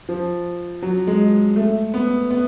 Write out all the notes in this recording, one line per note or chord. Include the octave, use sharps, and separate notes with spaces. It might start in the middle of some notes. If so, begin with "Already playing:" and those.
F3
F#3
G#3
A3
B3
B3